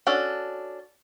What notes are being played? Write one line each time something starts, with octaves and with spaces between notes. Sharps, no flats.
C#4 D4 F#4 A4